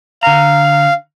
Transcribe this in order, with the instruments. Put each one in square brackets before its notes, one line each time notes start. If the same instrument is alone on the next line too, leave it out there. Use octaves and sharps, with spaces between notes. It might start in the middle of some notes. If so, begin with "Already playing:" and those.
[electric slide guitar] D3 A#5 [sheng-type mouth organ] F5